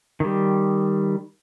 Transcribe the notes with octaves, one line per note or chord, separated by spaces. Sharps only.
D#3 G3